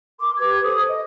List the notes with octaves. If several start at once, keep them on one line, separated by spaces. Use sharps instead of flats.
A#4 C6 D6
G4 B4 D6 G#6
A4 C5 D#6
D#5